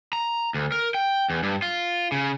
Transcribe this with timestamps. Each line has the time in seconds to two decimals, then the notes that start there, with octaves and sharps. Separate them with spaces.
0.13 A#5
0.54 D2
0.72 A#4
0.94 G5
1.30 E2
1.43 G2
1.62 F4
2.12 C#3